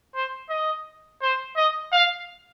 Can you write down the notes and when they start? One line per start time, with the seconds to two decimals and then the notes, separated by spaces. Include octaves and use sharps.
0.15 C5
0.50 D#5
1.21 C5
1.57 D#5
1.92 F5